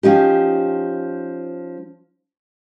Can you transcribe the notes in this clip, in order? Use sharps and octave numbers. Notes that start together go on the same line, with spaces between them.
F3 C#4 D#4 G4